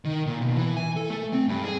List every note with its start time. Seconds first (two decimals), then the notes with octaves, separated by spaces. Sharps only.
0.05 D#3
0.26 A#2
0.41 B2
0.56 E3
0.77 G#5
0.97 A4
1.10 A3
1.33 C4
1.48 G2
1.64 G#4